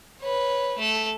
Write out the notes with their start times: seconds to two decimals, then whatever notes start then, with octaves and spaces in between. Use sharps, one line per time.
0.21 B4 C#5
0.78 A3 A4